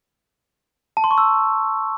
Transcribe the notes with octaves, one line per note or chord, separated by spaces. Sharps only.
A5
C6
C#6
E6